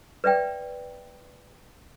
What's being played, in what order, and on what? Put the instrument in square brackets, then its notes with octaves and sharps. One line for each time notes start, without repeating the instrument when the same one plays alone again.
[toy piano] B4 D5 E5 G5